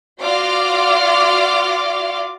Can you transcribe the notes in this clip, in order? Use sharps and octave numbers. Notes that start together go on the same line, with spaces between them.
F4 F#4 D5 C6 D6 F6